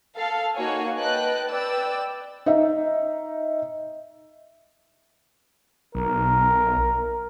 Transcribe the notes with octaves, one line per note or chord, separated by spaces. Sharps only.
A4 F5
A#3 D#4 F#4 C#5 G#5
B4 D#5 G5 A5 F#6
B4 D5 G5 E6
D#4 E5
B1 A#4